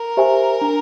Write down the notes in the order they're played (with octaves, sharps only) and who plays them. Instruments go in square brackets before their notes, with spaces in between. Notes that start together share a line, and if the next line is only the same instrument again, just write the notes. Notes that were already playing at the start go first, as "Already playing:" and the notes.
Already playing: [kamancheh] A#4
[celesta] G4 C5 E5 G#5
D4